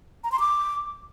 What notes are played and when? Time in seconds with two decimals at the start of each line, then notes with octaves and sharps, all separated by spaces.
0.24 A#5
0.32 C6
0.40 D6